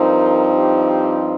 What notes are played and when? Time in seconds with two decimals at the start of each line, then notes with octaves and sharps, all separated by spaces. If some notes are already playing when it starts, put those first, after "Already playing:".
Already playing: G2 F3 C4 D#4 A#4
0.54 G4
0.89 G4